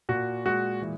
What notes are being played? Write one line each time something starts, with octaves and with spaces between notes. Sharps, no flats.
A#2 F#4
G#3 F#4
E3